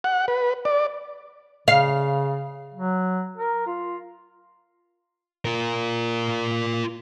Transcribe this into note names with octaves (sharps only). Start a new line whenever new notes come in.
F#5
B4
D5
C#3 F5
F#3
A#4
F4
F4 A#4